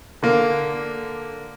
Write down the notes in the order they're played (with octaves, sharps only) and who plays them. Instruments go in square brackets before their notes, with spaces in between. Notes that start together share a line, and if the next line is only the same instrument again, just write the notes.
[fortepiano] D3 A#3